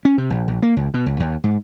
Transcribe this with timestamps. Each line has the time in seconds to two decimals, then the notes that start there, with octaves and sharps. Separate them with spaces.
0.05 C#4
0.18 C3
0.30 A#1
0.48 A#1
0.62 A#3
0.77 C#2
0.94 B2
1.06 C#2
1.20 D#2
1.44 G#2